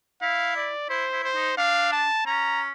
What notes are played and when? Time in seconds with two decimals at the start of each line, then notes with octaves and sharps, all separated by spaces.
0.22 E4 F5
0.56 D5
0.89 E4 C5
1.13 E4
1.24 C5
1.35 D#4
1.57 D4 F5
1.92 A5
2.26 C#4 A#5